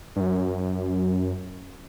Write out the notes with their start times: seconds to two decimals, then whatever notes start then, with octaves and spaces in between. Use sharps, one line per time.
0.16 G2
0.20 F#2